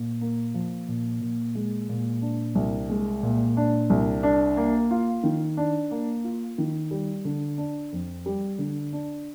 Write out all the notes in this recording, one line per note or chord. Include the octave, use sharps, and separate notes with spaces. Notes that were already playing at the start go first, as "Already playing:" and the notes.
Already playing: A#2
A#3
F3
A#2
A#2
G#3
A#2
D4
C2
G#3
A#2
D4
C2
D4
A#3
F4
D#3
D4
A#3
F4
D#3
G3
D3
D4
F2
G3
D3
D4